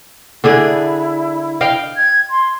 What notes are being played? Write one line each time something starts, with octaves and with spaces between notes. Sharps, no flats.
D3 D4 E4 G#4
D#5 F5 G5
G#6
C6